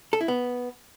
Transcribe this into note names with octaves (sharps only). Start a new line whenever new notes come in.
A4
E4
B3